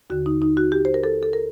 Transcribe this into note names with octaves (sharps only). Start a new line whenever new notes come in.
D#2 D3 F#4
D#4
D#4
F#4
G4
C5
A#4
A4
A4
A#4